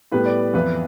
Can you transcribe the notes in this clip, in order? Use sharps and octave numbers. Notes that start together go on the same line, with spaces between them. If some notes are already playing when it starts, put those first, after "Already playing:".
A2 G3 B3 B4
D5
F2 E3 B3 B4